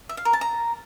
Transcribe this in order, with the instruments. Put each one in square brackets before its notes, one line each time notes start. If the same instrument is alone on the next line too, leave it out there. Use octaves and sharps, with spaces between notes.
[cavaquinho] E5
F5
A#4
A5
A#5